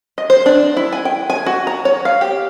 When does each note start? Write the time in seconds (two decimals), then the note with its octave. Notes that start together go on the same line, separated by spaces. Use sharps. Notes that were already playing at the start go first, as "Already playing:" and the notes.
0.18 D#5
0.30 C5
0.46 D4
0.77 E4
0.92 G#5
1.05 G5
1.30 G#5
1.46 F#4
1.67 A#5
1.85 C#5
2.05 F5
2.21 G4